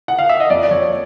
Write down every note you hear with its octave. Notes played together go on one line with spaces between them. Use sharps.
F#5
F5
E5
D#5
F2 D5
D5
F2 C#5